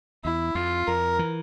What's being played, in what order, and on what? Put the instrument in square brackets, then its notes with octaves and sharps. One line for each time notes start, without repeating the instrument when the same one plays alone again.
[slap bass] E2 [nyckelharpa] E4
[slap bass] F2 [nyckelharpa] F4
[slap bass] F2 [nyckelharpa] A#4
[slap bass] E3